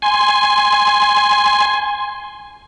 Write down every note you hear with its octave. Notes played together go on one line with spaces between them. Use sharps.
G#5 C6